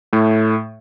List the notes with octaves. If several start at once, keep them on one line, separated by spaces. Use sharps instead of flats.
A2 A3